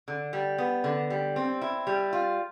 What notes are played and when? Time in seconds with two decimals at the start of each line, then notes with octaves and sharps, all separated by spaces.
0.08 D3
0.33 G3
0.58 B3
0.84 D3
1.10 G3
1.36 C4
1.61 E4
1.87 G3
2.13 F4